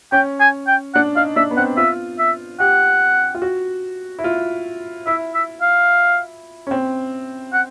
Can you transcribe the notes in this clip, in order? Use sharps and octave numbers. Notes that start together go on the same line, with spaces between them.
C#4 G5
G#5
G5
D4 F#5
D#4 F5
D4 E5
B3
C4 F#5
F4 E5
E5
G4 F#5
F4
F#4
E4
F4
E4 E5
E5
F5
C#4
C4
F#5